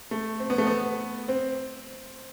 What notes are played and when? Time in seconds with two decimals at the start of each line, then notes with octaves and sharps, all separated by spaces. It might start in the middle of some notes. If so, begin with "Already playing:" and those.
0.11 A3
0.40 C4
0.50 B3
0.58 A3
0.67 B3
1.28 C4